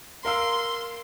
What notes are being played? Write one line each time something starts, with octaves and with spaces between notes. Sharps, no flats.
A#4 F5 C6 E6